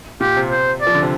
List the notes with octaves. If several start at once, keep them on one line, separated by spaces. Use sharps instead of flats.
A#2 G4
C3
C5
D5
F3
D3
C3